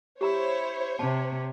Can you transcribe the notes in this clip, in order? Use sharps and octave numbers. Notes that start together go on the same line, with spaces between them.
E4 G4 C5 C#5 A#5 E6
C3 A5